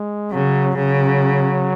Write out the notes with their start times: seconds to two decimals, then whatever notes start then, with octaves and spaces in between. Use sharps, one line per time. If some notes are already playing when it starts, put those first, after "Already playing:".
Already playing: G#3
0.32 C#3 F#3
0.77 C#3 F#3